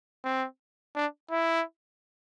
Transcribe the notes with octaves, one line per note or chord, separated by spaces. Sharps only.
C4
D4
E4